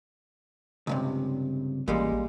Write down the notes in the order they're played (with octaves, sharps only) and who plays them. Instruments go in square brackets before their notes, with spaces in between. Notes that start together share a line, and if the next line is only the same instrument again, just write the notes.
[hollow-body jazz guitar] C#2 G2 C3
[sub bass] A1 [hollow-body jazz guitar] A#2 G3 G#3